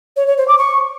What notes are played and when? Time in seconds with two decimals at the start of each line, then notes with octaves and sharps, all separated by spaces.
0.16 C#5
0.27 C#5
0.37 C5
0.48 D6
0.58 C#6